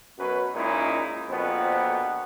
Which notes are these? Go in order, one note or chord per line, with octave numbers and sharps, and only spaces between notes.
F#2 B2 F#3 C#4 B4
A#2 G#3 C#4 D#4 E4
A#1 F2 B2 B3 C4